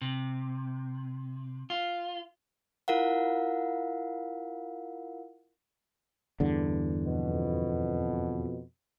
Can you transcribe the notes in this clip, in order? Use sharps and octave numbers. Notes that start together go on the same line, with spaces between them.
C3
F4
E4 F4 A#4 F5 F#5
E2 G2 D3
F2 B2